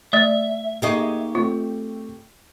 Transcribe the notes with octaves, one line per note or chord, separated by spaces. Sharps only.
A3 D5 E5
A#3 D#4 G4 G#4 D#5 C#6
A3 C4 F4